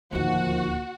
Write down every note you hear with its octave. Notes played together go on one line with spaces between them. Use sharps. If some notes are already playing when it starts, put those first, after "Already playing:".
D1 D#2 D#3 F3 F#4 F#5